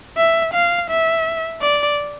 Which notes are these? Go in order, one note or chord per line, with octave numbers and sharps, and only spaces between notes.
E5
F5
E5
D5